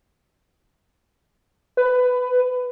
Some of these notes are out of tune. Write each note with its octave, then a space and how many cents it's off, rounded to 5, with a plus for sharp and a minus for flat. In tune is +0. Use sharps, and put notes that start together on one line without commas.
B4 +20